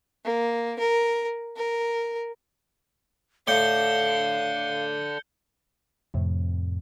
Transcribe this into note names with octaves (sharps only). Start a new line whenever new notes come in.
A#3
A#4
A#4
A2 A4 D5 F5 G5 G6 C#7 G7
F2 A2 C3